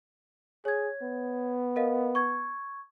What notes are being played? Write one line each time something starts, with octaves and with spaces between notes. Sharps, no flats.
G#4 C#5 G#6
B3
A#4 D#5 F5
C#6 G#6